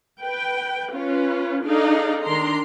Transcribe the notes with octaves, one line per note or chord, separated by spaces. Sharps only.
B4 G5
C#4 F4 B4
D4 D#4 G#4 A4 D5 F5
D#3 D4 A#5 C6